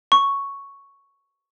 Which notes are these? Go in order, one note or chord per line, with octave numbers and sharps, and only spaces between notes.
C#6